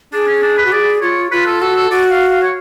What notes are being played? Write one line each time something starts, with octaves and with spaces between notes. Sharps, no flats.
D4 G#4
C#4
D4
B4
F#4
G#4 D5
F4 C#5
F4 B4
A4
F#4 A4
A4
F#4 D5
F5
F5
C#5